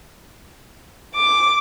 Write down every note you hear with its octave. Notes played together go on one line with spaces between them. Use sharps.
D6